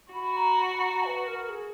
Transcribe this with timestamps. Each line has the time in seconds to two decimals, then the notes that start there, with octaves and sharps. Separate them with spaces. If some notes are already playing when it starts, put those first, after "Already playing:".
0.14 F#4 B5
0.36 A#5
0.59 B5
0.82 A#5
1.04 B4
1.27 A#4
1.49 G#4